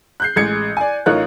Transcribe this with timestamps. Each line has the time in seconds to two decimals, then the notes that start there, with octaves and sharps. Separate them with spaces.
0.20 F#6 G6 C7
0.36 A1 G#3 G#6 C#7
0.77 D5 G#5
1.06 A1 D#4 F4 A#4 C#5 F#6